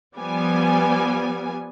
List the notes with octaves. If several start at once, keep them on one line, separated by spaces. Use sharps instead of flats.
F3 G3 B3 G#5